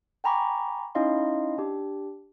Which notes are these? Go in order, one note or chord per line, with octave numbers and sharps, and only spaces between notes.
G5 G#5 A#5 B5 C#6 D6
C#4 D#4 E4 D#5 F5 C6
D4 G4 D6